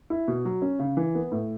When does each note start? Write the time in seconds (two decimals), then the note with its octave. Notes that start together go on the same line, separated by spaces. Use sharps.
0.10 E4
0.28 B2
0.45 F#3
0.62 C#4
0.79 C#3
0.97 E3
1.15 B3
1.32 A2